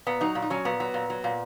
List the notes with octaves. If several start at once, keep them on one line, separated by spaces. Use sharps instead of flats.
A#2 B3
F#3 D#4
A#2
D#4
F#3 C#4
A#2 B3
F#3
A#2
F#3
A#2